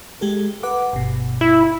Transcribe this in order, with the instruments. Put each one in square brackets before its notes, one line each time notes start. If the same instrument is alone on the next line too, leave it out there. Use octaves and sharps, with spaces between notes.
[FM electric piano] G#3 G4 A4
B4 F#5 D6
G1 B2
[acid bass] E4